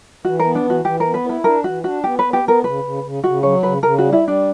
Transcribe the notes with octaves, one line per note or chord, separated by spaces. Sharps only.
E3 F#4
A#4
B3
D4
E3
F#4
E3 G4
B3 A#4
B4
E4
B4
D4 A#4
E3 F#4
D4 F#4
B3 G4
B4
B3
G4
B3 A#4
C#3 B4
C#3
C#3
C#3 F#4
F#3 C#5
C#3 B4
C#3 A#4
G3 F#4
E4
G3 D4